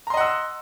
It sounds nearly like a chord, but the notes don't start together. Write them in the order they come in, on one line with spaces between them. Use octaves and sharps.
A#5 C6 D#5 F#5 E6